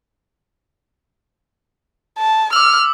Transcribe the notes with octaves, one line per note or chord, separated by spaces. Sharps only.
A5
D6 E6 F6